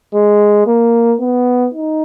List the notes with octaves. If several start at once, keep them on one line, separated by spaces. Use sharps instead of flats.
G#3
A#3
B3
D#4